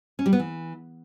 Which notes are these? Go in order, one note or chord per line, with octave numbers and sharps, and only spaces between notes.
C#4
G3
B3
E3